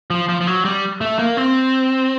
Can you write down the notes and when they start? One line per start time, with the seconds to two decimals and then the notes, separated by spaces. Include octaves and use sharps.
0.10 F3
0.29 F3
0.41 F3
0.47 F#3
0.65 G3
1.01 A3
1.19 A#3
1.37 C4